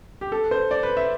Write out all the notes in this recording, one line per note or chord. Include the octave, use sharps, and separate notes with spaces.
G4
A4
C5
D5
B4
E5